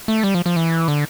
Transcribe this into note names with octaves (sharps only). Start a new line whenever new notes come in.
A3
G3
F3
F3
E3
D3